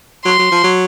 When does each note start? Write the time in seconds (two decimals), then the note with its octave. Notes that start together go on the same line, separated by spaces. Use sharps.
0.25 F#3 C6
0.39 F#3
0.52 F3
0.64 F#3